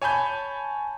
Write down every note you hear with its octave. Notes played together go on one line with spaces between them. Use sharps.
C#5 G#5 A5 B5 G6